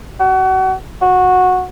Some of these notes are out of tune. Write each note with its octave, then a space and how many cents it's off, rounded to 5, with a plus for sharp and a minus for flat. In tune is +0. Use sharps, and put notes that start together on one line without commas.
F#4 +30
F#4 -15